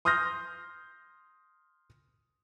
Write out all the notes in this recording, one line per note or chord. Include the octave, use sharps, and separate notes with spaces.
C6 D#6 F6 G6 A#6